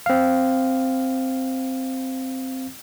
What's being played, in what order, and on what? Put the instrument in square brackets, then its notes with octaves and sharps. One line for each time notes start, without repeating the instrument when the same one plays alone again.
[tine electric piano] C4 F5